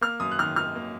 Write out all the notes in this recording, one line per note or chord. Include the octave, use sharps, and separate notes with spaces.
A#3 F6
F#2 D#6
F#6
D#3 F6
D#4 F6
A#3